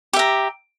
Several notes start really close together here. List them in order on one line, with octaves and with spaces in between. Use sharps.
G4 E5 A#5